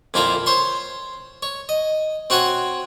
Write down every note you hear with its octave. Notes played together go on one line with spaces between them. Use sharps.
F2 A#2 E4 F4 A4 A#5
C5 C#5 C6
C#5
D#5
C4 F#4 C#5 F#5 G#5